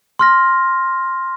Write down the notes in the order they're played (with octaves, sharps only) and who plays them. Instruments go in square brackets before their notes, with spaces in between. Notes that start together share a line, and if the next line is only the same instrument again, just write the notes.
[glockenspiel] C6 F6 A#6